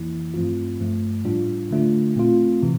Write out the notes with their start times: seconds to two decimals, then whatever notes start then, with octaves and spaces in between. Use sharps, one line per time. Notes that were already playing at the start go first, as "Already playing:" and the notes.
Already playing: F2 E3 A#3 E4
0.34 G2 F3 A3 C4 F4
0.80 G2 F3 A3
1.25 A2 G3 D4 F4
1.71 D3 A3 D4 F4
2.16 A#2 A3 C4 F4
2.63 C3 E3